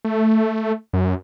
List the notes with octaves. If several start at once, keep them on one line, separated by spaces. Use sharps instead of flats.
A3
F#2